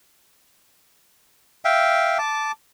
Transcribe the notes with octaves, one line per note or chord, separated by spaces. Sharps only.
E5 F5 G5
A5 D6